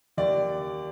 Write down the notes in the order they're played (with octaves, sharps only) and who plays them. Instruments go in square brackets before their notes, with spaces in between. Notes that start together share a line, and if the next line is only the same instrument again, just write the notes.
[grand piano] D#2 D5